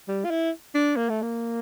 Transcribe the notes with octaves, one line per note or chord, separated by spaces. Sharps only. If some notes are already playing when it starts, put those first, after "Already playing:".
G3
F4
E4
D4
A#3
A3
A#3